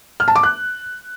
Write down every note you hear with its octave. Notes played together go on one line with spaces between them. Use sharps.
F6
A5
D6
F#6